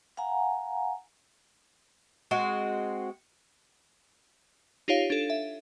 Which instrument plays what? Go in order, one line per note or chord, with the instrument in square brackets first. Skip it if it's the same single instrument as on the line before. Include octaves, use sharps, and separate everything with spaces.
[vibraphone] F5 F#5 G#5 A#5
[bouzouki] G#3 C4 F#4
[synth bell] D#4 F4 G4 C#5 F5
D4 A4
E5